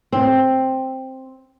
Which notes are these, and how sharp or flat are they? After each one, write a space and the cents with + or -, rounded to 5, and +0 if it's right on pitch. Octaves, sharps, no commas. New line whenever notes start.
C4 +5